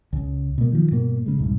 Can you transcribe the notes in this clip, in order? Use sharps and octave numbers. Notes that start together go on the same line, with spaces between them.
C#2 C#3
B2 A#3
D#3 F3
G2 B2 A#3
C#3 G#3
E1 C2 G#2